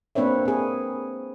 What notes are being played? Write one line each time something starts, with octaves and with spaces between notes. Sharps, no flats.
A#3 C4 D4 B4 C#5 E5
C4 G#4